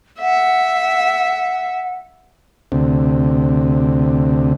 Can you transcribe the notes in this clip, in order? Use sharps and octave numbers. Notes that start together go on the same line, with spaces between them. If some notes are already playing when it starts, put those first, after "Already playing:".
E5 F#5
D2 C3